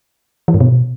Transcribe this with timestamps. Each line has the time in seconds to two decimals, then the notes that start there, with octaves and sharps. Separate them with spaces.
0.48 E3
0.54 G#2
0.61 B2